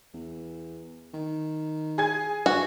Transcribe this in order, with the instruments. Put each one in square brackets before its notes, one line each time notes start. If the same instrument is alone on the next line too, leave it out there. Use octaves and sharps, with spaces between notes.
[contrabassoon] E2
D#3
[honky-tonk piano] G#4 G#5 G#6
[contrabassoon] G2 [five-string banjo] F#4